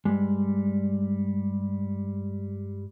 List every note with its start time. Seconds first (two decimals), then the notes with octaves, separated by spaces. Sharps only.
0.05 G2 G3 G#3